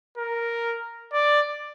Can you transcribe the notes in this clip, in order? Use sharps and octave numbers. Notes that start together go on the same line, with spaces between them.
A#4
D5